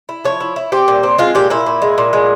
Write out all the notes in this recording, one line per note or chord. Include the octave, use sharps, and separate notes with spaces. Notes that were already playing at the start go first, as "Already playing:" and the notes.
E4
F3 C#5
E4
E4
C4 G4
A#2
C4
G#3 F4
A#2 G4
A#2 E4
A#2
G#3
A#2
G#3